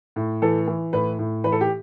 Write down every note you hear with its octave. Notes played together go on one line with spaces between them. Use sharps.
A2
E3 A4
E3
A2 B4
A2
E3 B4
A4
G4